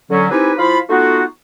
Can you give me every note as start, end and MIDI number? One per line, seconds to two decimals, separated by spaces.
0.10 0.30 50
0.10 0.30 54
0.10 0.30 61
0.31 0.53 60
0.31 0.53 63
0.31 0.53 64
0.31 0.53 67
0.31 0.53 71
0.31 0.53 80
0.58 0.78 53
0.58 0.78 64
0.58 0.78 65
0.58 0.78 77
0.58 0.78 83
0.89 1.23 57
0.89 1.23 59
0.89 1.23 63
0.89 1.23 65
0.89 1.23 66